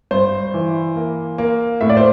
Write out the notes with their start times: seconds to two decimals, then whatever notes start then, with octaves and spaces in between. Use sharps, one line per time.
0.11 G2 C5
0.54 E3
0.96 A#3
1.38 A#3
1.81 A2 E5
1.89 D5
1.97 C5